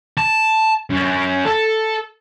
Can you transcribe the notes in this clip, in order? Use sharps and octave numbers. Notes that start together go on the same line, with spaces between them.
A5
F#2
A4